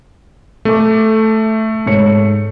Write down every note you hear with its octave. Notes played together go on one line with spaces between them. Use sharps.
A3 A4 D6
G#2 C#5 C#7